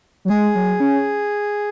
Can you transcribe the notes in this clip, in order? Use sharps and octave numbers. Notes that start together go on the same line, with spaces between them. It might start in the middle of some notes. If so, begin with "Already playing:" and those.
F#3
G#3 G#4
F#3
C#4